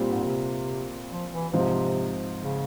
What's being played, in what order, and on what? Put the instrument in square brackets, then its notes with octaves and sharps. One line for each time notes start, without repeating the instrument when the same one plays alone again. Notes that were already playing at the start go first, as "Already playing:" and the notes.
Already playing: [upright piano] A#2 G3 C4
[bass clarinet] G#2
C3
F3
E3
[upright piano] G#2 F3 C4 [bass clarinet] C3
[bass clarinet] C#3